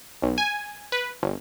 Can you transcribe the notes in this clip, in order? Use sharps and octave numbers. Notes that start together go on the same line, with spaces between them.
B1
G#5
B4
G1